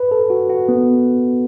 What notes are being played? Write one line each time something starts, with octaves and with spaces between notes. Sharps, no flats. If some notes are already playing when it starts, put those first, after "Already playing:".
Already playing: B4
A4
F#4
F#4
B3